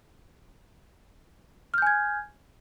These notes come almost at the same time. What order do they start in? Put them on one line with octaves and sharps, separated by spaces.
F6 G6 G#5 G#6